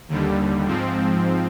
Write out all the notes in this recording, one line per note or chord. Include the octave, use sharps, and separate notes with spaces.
D#2 D3 G3
G#2 F3 C4